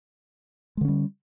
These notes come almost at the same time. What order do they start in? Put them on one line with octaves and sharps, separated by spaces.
G#3 D3 C#4 G3